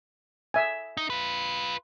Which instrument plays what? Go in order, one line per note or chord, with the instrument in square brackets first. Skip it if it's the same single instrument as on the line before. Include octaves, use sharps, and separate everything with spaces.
[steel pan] E5 G#5
[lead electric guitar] D#4
F4 B4